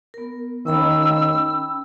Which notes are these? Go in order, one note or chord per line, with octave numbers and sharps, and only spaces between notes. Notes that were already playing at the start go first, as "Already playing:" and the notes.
B3 A#4
D#3 C#4 G5 B5 E6